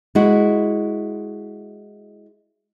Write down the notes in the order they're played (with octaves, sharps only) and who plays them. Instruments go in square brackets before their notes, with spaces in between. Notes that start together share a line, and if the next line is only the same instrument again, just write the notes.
[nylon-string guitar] G#3 E4 F#4